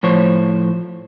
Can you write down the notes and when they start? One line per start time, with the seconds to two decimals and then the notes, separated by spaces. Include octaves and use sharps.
0.03 A2 F3 C5 C#5